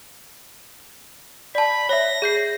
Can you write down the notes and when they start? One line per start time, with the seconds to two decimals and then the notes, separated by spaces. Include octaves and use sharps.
1.55 D5 A5 B5
1.89 C#5 E5 A#6
2.22 G#4 G6 C7